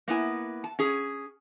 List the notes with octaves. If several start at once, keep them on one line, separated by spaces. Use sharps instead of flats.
A#3 B3 E4 G#5
A5
C#4 G#4